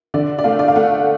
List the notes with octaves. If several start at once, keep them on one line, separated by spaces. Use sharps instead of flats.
D3 D5
D5
A3 F5
D5
F5
A3 F#5